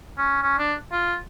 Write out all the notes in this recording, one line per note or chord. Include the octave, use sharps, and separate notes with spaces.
C#4
C#4
D4
F4